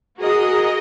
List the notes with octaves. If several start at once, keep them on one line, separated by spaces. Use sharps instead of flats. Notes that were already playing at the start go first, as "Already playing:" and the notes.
F#4 G#4 A#4 D#5